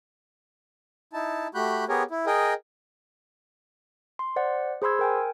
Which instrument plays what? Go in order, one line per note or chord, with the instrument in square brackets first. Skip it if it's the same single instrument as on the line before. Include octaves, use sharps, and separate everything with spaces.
[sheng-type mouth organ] D#4 E4 A5
A3 F#4 G4 B5 F#6 G6
B3 G4 G#4 A#4 C#5
E4
G#4 A#4 D#5 G5
[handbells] C6
C5 D5 F#5
G#4 C5 B5 C6 E6 G#6
A#4 G5 G#5